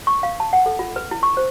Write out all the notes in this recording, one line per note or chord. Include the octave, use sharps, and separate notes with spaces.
C#6
F5
A5
F#5
A4
F4
B4
E4
C#6
C5